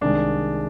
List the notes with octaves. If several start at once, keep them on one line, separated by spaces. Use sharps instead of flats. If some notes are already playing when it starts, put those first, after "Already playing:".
C2 C3 D#3 G#3 D4